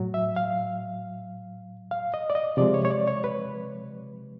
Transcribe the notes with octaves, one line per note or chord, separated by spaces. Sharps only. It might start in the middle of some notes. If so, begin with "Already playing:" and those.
Already playing: A2 F#3
E5
F5
F5
D#5
D5
D#5
C3 F3 G#3 D5
C#5
C#5
D5
C#5
B4